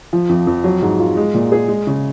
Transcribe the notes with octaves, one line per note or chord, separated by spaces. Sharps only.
F3
F2
F2
F#3
G#2
F4
G#3
A#2
G#4
G#3
C#3